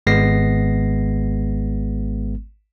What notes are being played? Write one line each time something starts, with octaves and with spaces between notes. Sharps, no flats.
G#1 G#3 B3 A#6 C7